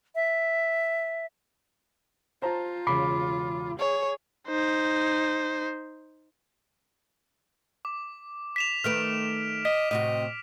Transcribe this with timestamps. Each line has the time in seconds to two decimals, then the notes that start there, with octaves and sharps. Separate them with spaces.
0.15 E5
2.42 F4 C5 A5 A#5
2.87 E1 C#3 B5 D6 C7
3.79 G#4 C#5
4.48 D#4 C5
7.85 D6
8.56 B6 E7 F7
8.84 D#3 A3 B4 F6 D7
9.65 D#5 B6
9.91 A2 C3 F#4 D#5